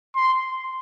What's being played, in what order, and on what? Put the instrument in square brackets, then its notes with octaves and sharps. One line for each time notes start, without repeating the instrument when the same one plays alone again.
[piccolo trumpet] C6